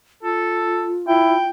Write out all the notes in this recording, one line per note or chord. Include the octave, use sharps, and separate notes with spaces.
F4 A4
E4 G5